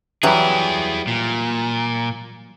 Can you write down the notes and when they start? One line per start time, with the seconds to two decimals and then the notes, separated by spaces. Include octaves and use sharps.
0.23 E3 F#3 G3 E4 G#4
1.07 A#2